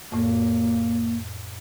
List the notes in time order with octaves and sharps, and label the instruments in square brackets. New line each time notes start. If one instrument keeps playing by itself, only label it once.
[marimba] F2 A2 [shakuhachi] A#3